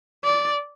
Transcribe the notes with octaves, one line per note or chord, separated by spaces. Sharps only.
D5